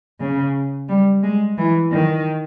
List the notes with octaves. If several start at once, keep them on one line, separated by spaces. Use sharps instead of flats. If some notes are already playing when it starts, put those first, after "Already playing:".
C#3
G3
G#3
E3
D#3